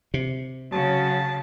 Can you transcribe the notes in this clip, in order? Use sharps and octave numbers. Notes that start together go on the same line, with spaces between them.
C3
C#3 F#3 A5